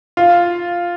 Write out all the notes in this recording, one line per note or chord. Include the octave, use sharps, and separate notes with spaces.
F4